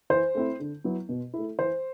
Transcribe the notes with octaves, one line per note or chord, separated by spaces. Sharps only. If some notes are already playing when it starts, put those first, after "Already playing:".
E3 C5
A3 C4 E4
D3
F#3 B3 E4
B2
A3 E4
E3 C5